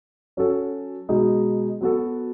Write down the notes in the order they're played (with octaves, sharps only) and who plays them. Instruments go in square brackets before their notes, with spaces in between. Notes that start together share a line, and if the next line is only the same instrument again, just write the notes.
[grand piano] F#3 C#4 F#4 A4
B2 G#3 D#4
F#3 B3 F#4 A4